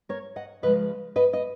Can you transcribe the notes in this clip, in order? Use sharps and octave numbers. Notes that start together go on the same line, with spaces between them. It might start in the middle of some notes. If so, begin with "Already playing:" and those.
A#4 C#5
D#5 F#5
C#3 F3 G#3 B4 D#5
B4 D#5
D#5